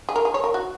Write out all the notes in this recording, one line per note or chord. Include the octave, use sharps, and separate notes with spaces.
G#4
A#4
G#4
C#5
A#4
F#4